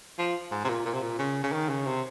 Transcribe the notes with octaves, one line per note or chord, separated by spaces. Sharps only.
F3
G#2
C3
A#2
A#2
C3
A#2
C#3
C#3
D#3
C#3
C3